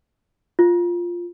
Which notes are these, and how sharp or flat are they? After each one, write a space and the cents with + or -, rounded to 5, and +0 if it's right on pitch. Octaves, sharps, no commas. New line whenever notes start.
F4 +0